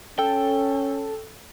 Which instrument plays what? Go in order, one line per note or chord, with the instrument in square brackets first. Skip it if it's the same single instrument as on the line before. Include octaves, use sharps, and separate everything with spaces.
[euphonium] C#4 [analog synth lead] A4 [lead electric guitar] G5